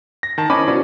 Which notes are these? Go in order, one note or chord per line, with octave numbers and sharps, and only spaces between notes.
A#6
D#3 A5
C#4 D#4 E4 A#4 C5 G#5 B5 D6
B2 C#4 D5